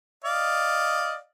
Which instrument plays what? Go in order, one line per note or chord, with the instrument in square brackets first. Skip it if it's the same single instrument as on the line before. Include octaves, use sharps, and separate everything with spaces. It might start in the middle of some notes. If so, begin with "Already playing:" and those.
[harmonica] D5 D#5 F5